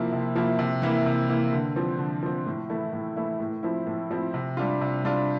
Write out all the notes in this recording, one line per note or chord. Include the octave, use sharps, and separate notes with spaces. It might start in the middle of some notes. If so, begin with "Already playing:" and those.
Already playing: C3 F3 A#3 E4
C3
F3 A#3 E4
C3
E3 A#3 E4
C3
E3 A#3 E4
D3
F3 C4
D3
F3 C4
A2
E3 A3 E4
A2
E3 A3 E4
A2
F3 C4 E4
A2
F3 C4 E4
C3
G3 D4 F4
C3
G3 D4 F4